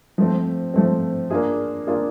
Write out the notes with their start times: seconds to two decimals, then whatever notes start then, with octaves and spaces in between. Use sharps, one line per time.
0.18 F3 A3 C4
0.74 F3 A3 C4
1.30 A#3 D4 F4 G#4
1.87 A#3 D4 F4 G#4